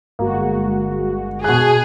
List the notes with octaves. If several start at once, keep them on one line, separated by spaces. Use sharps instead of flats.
G1 G#3 A#3 F#4
B2 G#4 F#6